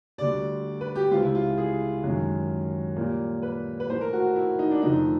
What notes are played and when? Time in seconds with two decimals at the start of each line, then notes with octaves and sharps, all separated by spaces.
0.18 D2 D3 G3 D5
0.81 B4
0.96 G4
1.11 C#2 C3 E3 G#3 F4
1.22 E4
1.35 F4
1.58 G#4
2.03 F#2 D#3 G#3
2.96 A#2 G3 A#3
3.43 B4
3.80 B4
3.90 A2 E3 A3 C5
4.01 A#4
4.13 F#4
4.36 E4
4.59 D#4
4.71 D4
4.82 F2 D3 F3 A3 D#4